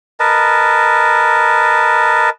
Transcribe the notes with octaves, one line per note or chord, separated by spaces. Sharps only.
A#4 B4 D#5 A5